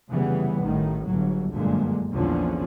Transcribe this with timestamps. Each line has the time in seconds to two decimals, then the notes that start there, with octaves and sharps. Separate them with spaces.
0.11 F1 C#3 E3 G3 B3
0.63 A1 A2 D#3
1.05 G1 F#3
1.53 G1 F#2 A#2 D3 G#3
2.12 A#1 E2 D3 F3 C#4